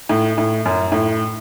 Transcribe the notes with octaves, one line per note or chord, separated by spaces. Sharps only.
A2
A2
F#2
A2